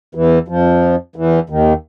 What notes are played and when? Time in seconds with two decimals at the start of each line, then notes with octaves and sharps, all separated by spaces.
0.15 E2 E3
0.48 F2 F3
1.16 E2 E3
1.50 D#2 D#3